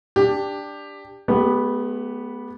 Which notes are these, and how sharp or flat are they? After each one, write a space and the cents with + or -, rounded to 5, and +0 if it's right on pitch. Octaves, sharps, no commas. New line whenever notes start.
D4 +0 G4 +15
G#3 +45 B3 -10 G4 +0